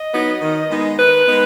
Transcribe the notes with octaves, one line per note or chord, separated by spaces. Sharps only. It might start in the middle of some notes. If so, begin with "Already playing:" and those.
Already playing: D#5
F#3 B3 D#4
D#3
G#3 B3 D#4
D#3 B4
G#3 B3 D#4